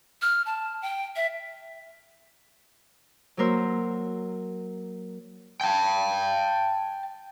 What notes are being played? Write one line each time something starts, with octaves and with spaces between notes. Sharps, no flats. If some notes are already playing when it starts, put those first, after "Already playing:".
F6
A5
G5
E5
F#3 A#3 A#4 C5 E6
G5 A5